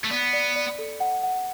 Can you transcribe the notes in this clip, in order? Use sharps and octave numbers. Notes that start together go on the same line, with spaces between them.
A3
B3 D5
D5
D5
A4
F#5
F#5